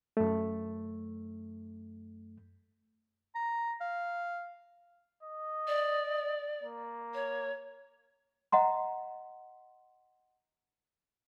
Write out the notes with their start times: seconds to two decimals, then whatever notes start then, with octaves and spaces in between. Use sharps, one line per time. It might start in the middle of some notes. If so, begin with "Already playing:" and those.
0.17 F#2 A3
3.35 A#5
3.80 F5
5.23 D#5
5.67 D5
6.63 A#3
7.14 C#5
8.52 D#5 F#5 A#5 C6